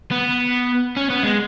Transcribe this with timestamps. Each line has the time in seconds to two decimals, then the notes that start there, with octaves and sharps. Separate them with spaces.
0.11 B3
0.97 C#4
1.10 B3
1.23 G#3